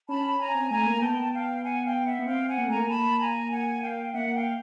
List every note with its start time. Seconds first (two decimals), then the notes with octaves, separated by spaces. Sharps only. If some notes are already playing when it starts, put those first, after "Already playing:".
0.08 C#4 A5 B5
0.40 C#4 G#5 A#5
0.55 C4
0.70 A3 G#5 A#5
0.86 A#3
1.02 B3 G5 A5
1.34 F5 G5
1.64 F#5 G#5
1.85 F5 G5
2.05 E5 F#5
2.19 B3
2.26 C4 F5 G5
2.48 F#5 G#5
2.58 A#3
2.67 A3 G#5 A#5
2.76 A#3
2.88 A5 B5
3.20 G#5 A#5
3.51 F#5 G#5
3.82 F5 G5
4.14 A#3 E5 F#5
4.35 F5 G5